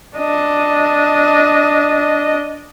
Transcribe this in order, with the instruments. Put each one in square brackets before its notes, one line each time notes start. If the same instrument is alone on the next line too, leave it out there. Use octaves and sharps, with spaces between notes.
[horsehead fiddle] D4 D#5